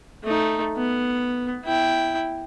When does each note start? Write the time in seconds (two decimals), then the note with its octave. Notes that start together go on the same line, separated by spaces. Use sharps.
0.24 A3 D#4
0.77 B3
1.65 E4 G5